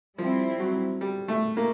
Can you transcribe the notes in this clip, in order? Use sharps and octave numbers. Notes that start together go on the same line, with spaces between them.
F3 G3 C4 E4
F#3
G3
A3
A#3